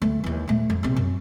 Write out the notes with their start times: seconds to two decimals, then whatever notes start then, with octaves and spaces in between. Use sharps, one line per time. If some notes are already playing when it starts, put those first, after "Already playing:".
0.02 D2 A3
0.24 D#2 E3
0.48 A#2 A3
0.70 F2
0.83 A#1 C3
0.96 F#2